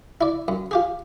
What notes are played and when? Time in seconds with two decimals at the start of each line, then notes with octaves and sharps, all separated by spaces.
0.21 E4 D5
0.48 F#2
0.71 F4 G4 G#4